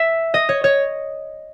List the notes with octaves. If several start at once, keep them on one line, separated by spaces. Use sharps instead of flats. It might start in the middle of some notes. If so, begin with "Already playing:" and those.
Already playing: E5
D#5
C#5
C#5